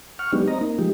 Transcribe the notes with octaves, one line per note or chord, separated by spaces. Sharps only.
F#5 C#6 F6
F#3 G#3 B3 D4 D#4 G4
C4 D#5 A#5
A#3 D#4
F3 G#3 D#4 G4